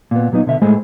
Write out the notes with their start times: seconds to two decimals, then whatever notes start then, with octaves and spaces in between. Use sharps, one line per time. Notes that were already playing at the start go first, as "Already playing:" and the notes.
0.11 A#2 B3
0.32 A#2 F#3 B3 D#4
0.46 B2 D3 E5
0.62 A2 G#3 A3 G#4 C5 B5